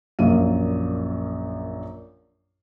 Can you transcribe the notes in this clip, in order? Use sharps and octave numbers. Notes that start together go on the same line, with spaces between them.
A#1 F#2 A#2 F5 D#7